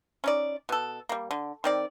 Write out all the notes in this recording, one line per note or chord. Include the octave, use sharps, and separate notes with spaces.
C#4 D#4 D5
B2 A4
G3 A#3
D3
D#3 C4 D5